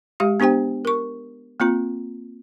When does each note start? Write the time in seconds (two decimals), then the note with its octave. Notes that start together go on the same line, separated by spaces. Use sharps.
0.20 G#3 G4 F5
0.40 B3 D4 G4 C5 G5
0.85 A#4 C#6
1.60 A#3 C4 F4 A#5